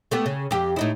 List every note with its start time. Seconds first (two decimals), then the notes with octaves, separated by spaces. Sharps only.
0.11 A3 B3 G4
0.26 C#3
0.51 F2 G4
0.76 A2 D#4 E4